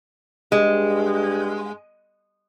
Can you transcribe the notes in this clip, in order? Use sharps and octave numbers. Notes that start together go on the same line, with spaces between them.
G2 G#3